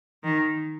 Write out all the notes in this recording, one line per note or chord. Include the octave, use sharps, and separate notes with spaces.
D#3